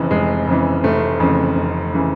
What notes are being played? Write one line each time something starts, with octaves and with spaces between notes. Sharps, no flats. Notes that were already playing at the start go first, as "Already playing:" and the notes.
Already playing: F1 F2 C#3 E3
F1 G#3
F2 C#3 E3
F1 A3
F2 C#3 E3
F1
C#3 E3